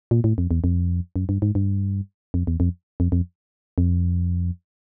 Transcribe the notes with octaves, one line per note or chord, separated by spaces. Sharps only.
A#2
A2
F2
E2
F2
F#2
G2
G#2
G2
F2
E2
F2
F2
F2
F2